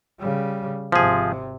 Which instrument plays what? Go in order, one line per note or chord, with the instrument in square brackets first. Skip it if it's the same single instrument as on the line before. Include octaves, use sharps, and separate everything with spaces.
[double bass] C#3 G3
[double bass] G#1 C3 [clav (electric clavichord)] F3 G#4